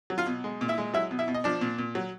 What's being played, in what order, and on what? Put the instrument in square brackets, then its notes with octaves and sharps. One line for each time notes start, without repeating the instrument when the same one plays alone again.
[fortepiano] F#3
F4 F5
B2
G#3
A#2
E4 E5
G#3
F#3 E4 E5
B2
E4 E5
B2
D#5
F3 D4 D5
A#2
A#2
F#3